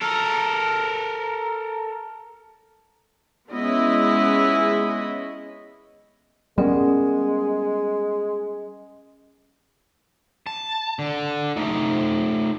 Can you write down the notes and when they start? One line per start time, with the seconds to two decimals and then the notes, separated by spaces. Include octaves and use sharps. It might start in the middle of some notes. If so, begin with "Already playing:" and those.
0.01 A4 A#4
3.51 G#3 B3 C#4 E4 D#5
6.58 G3 G#3 B3 C#4 A#4
10.47 A5
10.99 D3
11.56 A3 D#4